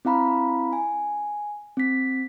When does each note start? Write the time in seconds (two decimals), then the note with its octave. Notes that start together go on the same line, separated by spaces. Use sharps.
0.05 C4 E4 F5 A#5 B5
0.73 G#5
1.77 C4 B6